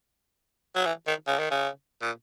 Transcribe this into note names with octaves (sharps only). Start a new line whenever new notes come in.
F#3
E3
D#3
C#3
D#3
C#3
A#2